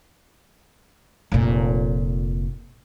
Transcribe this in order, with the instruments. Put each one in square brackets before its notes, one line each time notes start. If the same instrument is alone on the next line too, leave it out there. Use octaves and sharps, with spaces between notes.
[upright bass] F1 A#2